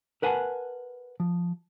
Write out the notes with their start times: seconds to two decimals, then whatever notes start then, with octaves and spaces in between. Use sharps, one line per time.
0.22 A#4 B4 F#5 G#5 A5
1.20 F3